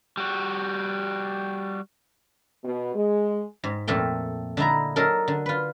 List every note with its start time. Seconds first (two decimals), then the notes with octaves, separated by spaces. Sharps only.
0.17 G3 F#4
2.64 B2
2.95 G#3
3.64 G#2
3.87 F2 A#2 A3 A4 G5
4.57 D3 D#4 E4 A#5
4.96 F#3 D#4 A4 A#4
5.28 D3
5.46 F4 B4